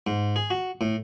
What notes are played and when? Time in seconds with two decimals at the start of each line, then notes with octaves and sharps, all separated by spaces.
0.07 G#2
0.36 G#4
0.50 F#4
0.81 A2